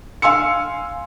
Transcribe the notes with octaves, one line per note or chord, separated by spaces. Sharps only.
F5 G#5 C6 E6 C#7